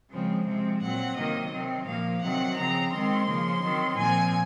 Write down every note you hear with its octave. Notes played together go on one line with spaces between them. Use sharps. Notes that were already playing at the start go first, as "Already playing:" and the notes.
C#3 F3 G#3 C4
C3 F3 G#3 C4
A#2 F#3 C4 F#5
C3 D#3 F#3 A#3 D#5
C3 D#3 F#3 C4
A#2 F3 A#3 F5
C3 D#3 F#3 C4 F#5
C#3 F3 C4 A#5
D#3 G#3 C4 C6
C#3 F3 A#3
D#3 F#3 C4
A#2 F3 C4 G#5